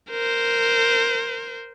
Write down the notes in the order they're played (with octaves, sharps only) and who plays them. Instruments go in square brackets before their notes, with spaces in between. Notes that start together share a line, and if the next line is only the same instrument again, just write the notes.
[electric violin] A#4 C5